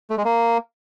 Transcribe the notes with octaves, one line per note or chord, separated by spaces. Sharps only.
A3
G#3
A#3